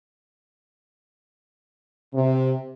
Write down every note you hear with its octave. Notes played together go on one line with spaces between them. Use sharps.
C3